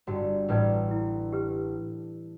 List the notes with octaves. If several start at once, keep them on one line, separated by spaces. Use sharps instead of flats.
G1 G2 F#4
A1 A2 B4 D5
E4
G4 B4